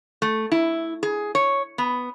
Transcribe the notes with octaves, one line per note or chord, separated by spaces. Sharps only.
A3
E4
G#4
C#5
B3